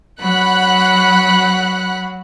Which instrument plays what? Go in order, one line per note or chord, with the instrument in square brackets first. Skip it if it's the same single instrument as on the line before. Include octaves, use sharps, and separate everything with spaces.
[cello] F#3 [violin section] F#5 B5 F#6